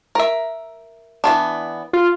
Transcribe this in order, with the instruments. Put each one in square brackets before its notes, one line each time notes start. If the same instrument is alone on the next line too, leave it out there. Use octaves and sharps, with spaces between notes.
[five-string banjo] A#4 E5
E3 B3 D4
[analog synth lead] F4